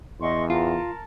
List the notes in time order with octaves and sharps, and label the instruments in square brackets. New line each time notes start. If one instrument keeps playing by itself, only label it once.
[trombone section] E2 [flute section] D#5 C6 C#6
[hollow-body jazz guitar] F4 [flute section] A#4 A5